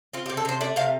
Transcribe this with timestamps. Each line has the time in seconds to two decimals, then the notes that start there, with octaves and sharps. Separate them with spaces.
0.13 C4 F4
0.26 G4
0.29 C3
0.37 A4
0.45 C3 C5
0.61 A3 D5
0.76 C3 F5